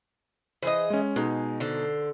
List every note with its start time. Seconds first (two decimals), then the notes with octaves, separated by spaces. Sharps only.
0.63 E3 G#4 C5 D#5
0.90 G#3 C#4
1.16 B2 G#3 D#4
1.60 D3 A4 C5